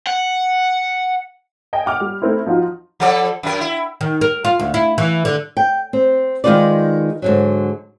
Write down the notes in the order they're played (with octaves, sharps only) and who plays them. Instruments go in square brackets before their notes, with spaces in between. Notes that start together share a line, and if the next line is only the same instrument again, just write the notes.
[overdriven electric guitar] F#5
[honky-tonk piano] D#5 G5 G#5
F#5 D6 F6
G3
A3 C4 D#4 E4
F3 D#4 F4 F#4
[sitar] F3 A4 D5
F#2 A#4
E4
[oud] D#3
A#4
F4
D2
E4
E3
D3
[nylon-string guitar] G5
C4
D#3 G#3 D#4 F4 B4 D5
G#2 D3 F#3